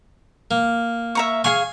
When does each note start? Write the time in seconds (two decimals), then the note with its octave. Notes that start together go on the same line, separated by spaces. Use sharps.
0.51 A#3
1.15 E5 A#5 C#6
1.44 G#4 F5 G#5 C#6